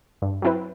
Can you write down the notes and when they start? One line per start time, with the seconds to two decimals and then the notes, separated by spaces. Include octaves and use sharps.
0.22 G2
0.42 F#3 C4 E4 B4